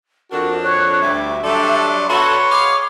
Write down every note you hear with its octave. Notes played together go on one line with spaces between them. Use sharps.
F2 D4 F#4 A#4
C#5 F#6
D2 G3 E5 D6
F#3 G3 D4 A4 D5 C6
B2 F#4 A4 B4 C#5 F#5 C6
G#4 D#5 F5 D6